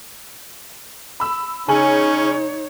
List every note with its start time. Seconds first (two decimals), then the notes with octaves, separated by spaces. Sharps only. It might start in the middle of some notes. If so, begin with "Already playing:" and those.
1.20 B5 E6
1.68 C#3 C#4 D#4 C#5 G#5 F#7